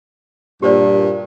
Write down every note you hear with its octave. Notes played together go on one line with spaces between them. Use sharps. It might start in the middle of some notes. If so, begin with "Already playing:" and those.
G2 A#2 G4 C5 D5